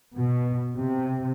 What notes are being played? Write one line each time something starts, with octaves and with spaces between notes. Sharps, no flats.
B2
C3